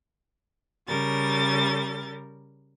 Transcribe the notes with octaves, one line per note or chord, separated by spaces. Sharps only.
C#3 G3 A#4 A6